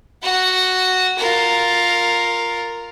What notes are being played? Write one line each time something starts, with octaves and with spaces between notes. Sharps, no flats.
F#4 F#5
F4 A#4